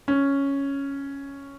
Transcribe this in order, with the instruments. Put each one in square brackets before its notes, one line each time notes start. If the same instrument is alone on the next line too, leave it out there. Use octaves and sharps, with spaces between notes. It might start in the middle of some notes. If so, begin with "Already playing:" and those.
[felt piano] C#4